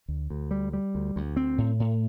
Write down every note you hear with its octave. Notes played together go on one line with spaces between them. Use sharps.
D2
D2
G3
G3
D2
D2
C4
A2
A2